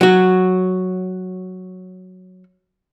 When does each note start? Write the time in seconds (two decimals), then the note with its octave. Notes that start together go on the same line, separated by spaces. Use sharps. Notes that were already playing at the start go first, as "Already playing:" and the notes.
0.01 F#3 F#4